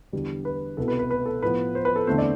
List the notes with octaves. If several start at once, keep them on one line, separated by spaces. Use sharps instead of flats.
E2 D3 G3
B4
C2 B2 B3 A4
B4
B4
B4
A4
A2 F3 B3 B4
C5
B4
A4
E2 D3 A3 C4 C5
D5